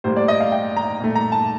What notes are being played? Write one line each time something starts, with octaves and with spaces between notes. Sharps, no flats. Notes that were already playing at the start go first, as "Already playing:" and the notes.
A2 G3 A#3 C5
D5
D#5
F5
G5
A#5
A#2 A3
A#5
A5